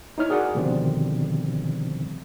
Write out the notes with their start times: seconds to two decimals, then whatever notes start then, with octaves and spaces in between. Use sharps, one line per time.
0.18 D#4 E4 C#5 F6
0.29 F#4 G#4 A#4 D5 F#5
0.55 B2 D3 D#3 F3 G3 C4